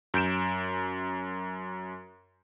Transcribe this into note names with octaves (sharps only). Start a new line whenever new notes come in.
F#2 G6 D7 E7